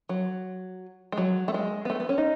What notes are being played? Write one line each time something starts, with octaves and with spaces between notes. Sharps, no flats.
F#3
G#3
F#3
A3
G#3
B3
A3
B3
C#4
D#4